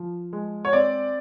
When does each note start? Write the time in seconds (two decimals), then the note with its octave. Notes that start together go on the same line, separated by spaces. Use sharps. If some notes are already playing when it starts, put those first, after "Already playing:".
Already playing: F3
0.33 G#3
0.65 C#5
0.73 C4 D5